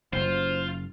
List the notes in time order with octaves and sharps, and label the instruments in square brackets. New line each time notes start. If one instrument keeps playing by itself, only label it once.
[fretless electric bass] F#1 [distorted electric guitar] F4 [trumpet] C5